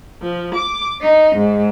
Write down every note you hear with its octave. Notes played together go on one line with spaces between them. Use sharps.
F3
D6
D#4
G#2